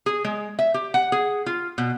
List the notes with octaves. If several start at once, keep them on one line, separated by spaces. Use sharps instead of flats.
G#4
G#3
E5
G4
F#5
G#4
F4
B2